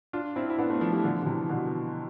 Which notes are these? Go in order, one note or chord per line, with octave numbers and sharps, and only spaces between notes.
D4 F4
C4 E4
E4
B3 D4
A3 C4
F3 A3
E3 G3
D3 F3
D3
C3 E3
B2 D3